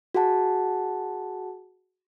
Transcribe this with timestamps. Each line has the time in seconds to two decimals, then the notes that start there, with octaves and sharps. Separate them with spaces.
0.14 F#4 G#4 F#5 A5